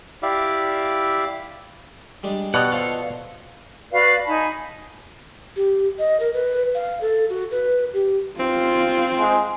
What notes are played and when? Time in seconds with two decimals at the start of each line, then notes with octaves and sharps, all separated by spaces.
0.23 E4 G4 D5 E5 F5
2.23 G3 G#3 D4
2.54 B2 G4 D5 D#5 F#5 A#5 C6
2.72 F4 A4 C5 C#5 F5
3.93 F#4 B4 D5 F5
4.26 D#4 G#5 A5 B5
5.56 G4
5.99 D#5
6.20 A#4
6.33 B4
6.75 F5
7.01 A4
7.30 F#4
7.51 B4
7.94 G4
8.39 C4 F4
9.18 G#3